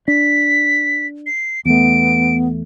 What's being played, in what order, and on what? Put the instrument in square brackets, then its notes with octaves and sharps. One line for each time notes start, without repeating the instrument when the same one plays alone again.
[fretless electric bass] D4 [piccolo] B6
[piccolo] C7
[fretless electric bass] E2 A3 [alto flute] B3 [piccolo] D7